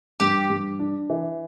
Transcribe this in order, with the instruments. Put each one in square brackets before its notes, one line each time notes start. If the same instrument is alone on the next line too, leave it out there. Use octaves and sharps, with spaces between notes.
[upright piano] G2 [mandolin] G4
[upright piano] G2
D4
E3